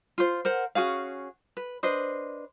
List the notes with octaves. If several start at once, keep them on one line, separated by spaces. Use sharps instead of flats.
F4 C5
A#4 C5 F#5
C#4 F#4 G#4 F5
B4
D4 B4 C5 D#5